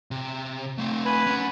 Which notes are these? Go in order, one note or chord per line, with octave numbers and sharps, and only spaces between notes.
C3
A3 C4
B4 G#5 B5
C#4 F#5